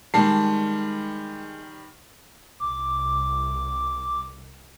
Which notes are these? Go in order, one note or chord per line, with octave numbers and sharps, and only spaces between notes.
D#3 G3 G#3 A5 C7
C2 D6